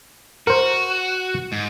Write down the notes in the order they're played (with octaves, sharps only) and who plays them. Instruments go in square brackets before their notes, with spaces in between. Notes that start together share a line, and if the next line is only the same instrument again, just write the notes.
[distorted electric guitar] F#4 [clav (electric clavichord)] A#4 C5
[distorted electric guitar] G#2